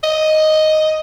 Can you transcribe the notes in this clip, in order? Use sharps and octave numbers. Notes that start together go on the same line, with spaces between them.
D#5